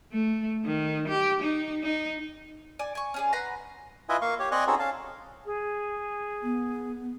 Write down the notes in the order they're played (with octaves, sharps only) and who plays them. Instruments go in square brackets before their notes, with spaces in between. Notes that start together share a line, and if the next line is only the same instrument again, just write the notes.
[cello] A3
D#3
G4
D#4
D#4
[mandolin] D5 G#5
G#5 C#6
C#4 G#4 D5
B4 F#5 A#5 C6
[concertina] E4 F4 B4 D#5 E5 G#5
A#3 F5 C#6
G4 C#5
C4 D5 D#5 G#5 C#6 F#6
C4 C#4 D#4 F#4 G#4 A4
C#4 F5 A5
[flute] G#4
[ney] B3